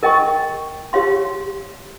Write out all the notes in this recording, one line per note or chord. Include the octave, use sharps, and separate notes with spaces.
A#4 D#5 G5 C#6
G4 C#5 F5 C6